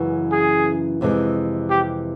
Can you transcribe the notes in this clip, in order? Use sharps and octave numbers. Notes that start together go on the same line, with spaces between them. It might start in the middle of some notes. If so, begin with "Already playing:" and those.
Already playing: F#2 C#3 E3 G#3 B3
G#4
F2 C3 E3 G#3
G4